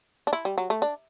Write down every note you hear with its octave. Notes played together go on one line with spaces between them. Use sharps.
D4
E4
G3
F#3
A3
D4